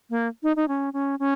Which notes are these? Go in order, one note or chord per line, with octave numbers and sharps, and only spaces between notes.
A#3
D#4
D#4
C#4
C#4
C#4